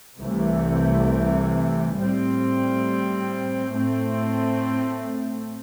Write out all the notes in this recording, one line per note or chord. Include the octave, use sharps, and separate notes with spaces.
C2 C3 E3 A3
A2 G3 C4
A2 A3 C4